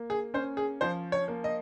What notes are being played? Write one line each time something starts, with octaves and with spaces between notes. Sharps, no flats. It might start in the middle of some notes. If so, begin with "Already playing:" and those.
Already playing: A#3
G#4
C#4 C5
G#4
F3 C5
C#5
A#3
D#5